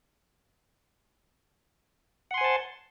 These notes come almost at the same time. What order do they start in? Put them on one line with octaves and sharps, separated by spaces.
F#5 C6 G#5 C5 A5